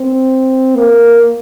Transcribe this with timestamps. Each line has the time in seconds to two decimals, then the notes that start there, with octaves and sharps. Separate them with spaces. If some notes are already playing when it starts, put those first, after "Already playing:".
Already playing: C4
0.75 A#3